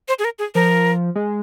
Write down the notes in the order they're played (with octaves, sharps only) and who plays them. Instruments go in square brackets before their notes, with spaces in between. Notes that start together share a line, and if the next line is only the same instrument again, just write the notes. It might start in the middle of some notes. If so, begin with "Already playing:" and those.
[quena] C5
G#4
A#4
G#4
[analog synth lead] F3 [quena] A#4
[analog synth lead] G#3